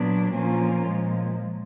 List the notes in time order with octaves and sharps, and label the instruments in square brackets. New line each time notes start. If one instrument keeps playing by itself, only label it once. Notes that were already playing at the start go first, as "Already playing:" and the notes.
Already playing: [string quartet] A#2 F#3 B3 D4
A#2 F3 A#3 C#4 F4
A#2 F3 G#3